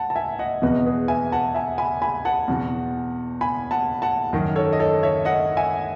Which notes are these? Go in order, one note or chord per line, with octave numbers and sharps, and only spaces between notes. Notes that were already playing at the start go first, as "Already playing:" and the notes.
Already playing: F#5 A5
A5
E5 G#5
D#5 F#5
E2 B2 B4 D#5
G#4 B4
E5 G#5
F#5 A5
E5 G#5
G#5 B5
G#5 B5
F#5 A5
E2 B2
G#5 B5
F#5 A5
F#5 A5
F#2 D#3
A4 C#5
D#5
A4 C#5
C#5 E5
D#5 F#5
E5 G#5